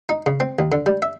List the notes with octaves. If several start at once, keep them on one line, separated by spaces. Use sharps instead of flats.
D#4
C#3
C4
D#2
D3
G3
E5